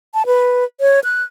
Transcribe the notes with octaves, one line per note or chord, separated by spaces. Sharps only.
A5
B4
C#5
F#6